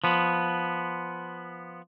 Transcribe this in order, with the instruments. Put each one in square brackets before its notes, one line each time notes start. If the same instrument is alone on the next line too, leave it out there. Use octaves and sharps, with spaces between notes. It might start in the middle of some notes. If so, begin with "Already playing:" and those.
[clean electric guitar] F3 B3